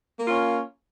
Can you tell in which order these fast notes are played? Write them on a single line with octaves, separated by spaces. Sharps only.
A#3 F4 C#4